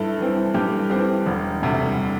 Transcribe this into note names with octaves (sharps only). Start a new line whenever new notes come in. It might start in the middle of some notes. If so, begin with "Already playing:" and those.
Already playing: G2 E4 A4
E3 C4
G2 G4
E3 C4 G4
E1
D2 C3 G3